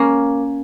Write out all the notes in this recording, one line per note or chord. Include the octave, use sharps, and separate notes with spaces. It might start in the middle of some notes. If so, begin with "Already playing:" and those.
Already playing: A#3 C#4